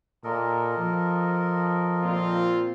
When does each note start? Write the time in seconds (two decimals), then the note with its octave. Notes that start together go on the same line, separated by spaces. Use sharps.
0.24 A#2 A4 A#4 D#5
0.77 F3
2.03 A#2 C4 F4